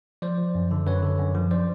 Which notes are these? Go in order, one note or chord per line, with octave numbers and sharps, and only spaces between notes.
F3 C5 D5
F3
F#2
D3
F#2 B4 C#5
D3
F#2
F3
C5 D5